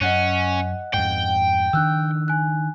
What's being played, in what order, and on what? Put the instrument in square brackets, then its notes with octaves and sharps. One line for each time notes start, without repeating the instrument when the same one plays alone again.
[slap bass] F#2 [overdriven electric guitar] C#4 [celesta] D#5 F#5 F#6
[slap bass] F2 G#2 [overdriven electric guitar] G5
[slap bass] D#3 D4 [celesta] E6 F#6
[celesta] G#5 F#6